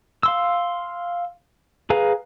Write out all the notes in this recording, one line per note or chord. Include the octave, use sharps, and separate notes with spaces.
F5 C6 E6
G#4 B4 F5 G#5 A#5